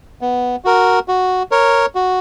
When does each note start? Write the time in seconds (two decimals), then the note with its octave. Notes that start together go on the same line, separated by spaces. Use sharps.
0.21 B3
0.65 F#4 A#4
1.08 F#4
1.51 A#4 C#5
1.95 F#4